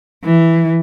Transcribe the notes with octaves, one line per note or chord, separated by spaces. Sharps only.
E3